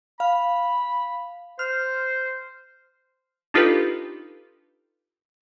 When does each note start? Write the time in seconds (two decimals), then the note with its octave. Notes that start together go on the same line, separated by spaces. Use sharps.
0.20 F5 B5
1.59 C5 F6
3.54 D4 D#4 F4 G4 A4 B4